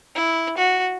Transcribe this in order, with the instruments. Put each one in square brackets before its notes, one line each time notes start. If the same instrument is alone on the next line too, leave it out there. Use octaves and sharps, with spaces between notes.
[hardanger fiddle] E4
F#4